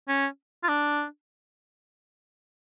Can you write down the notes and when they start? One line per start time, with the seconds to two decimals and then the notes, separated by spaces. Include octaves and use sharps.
0.08 C#4
0.63 F4
0.68 D4